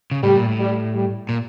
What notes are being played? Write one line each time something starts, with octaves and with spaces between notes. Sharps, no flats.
C#3
A2 G3
A#2
A2
G3
G3
A#2